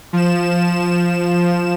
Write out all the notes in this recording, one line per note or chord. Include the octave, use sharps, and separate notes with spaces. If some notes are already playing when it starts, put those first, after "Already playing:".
F3 E7